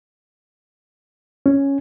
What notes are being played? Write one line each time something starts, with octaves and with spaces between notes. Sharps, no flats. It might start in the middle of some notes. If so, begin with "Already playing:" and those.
C#4